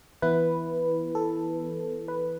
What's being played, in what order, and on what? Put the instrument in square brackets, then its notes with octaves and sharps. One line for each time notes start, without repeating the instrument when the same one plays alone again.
[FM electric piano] E3 B3 E4 B4
A4
B4